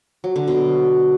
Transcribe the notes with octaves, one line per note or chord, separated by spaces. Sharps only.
F#3
D3
B2